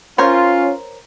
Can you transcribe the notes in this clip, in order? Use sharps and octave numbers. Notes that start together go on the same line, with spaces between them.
C#4 F4 A#4 C5 C#5